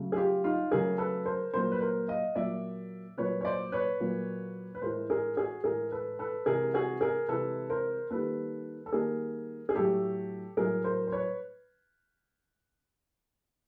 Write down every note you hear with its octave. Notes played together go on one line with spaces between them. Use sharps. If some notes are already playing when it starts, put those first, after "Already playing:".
Already playing: C#3 F#3 A3
G#4
F4 G4
D#4 F4
C#3 F#3 A3 G#4 A#4
A4 B4
A#4 C5
A#2 F#3 A#3 A#4 C5
B4
A#4 C5
D#5 F5
A#2 F#3 A#3 D5 E5
A#2 F#3 A#3 B4 C#5
C#5
C5 D5
B4 C#5
A#2 F#3 A#3
B4
A2 E3 G#3 A#4 C5
G#4 A#4
F#4 G#4
A2 E3 G#3 G#4 A#4
A4 B4
A4 B4
C3 E3 G#3 G#4 A#4
F#4 G#4
G#4 A#4
C3 E3 G#3 A4 B4
A#4 C5
D#3 G3 A#3 A4 B4
A4
D#3 G3 A#3 G#4 A#4
G#4
A2 F#3 A3 G4 A4
A2 F#3 A3 G#4 A#4
A#4 C5
C5
B4 C#5